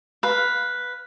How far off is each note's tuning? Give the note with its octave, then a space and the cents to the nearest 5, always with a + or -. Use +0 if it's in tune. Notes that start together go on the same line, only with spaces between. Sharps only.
B4 +0 F5 +10